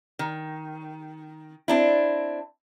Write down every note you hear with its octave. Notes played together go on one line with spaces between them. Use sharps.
D#3
C4 D4 E4